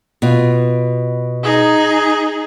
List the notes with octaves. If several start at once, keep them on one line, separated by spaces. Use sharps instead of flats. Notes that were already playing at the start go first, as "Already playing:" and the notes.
B2 F4
D#4 G#4